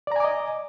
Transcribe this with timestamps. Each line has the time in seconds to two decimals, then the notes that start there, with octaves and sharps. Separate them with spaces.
0.07 D5
0.12 A#5
0.16 G#5
0.20 D6
0.24 D#5